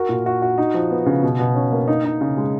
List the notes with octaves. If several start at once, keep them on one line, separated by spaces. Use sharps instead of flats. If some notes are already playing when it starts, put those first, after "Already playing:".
Already playing: F#4 A#4
A#2
F#4
F#4
D#4
F3
B3
C#3
B2
B2
C#4
A#3
D#4
D#4
C#3
G#3